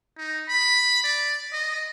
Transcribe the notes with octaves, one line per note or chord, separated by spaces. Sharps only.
D#4
B5
D5
D#5